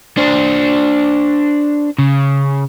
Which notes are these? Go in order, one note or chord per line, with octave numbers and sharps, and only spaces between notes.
D4 C5
C#3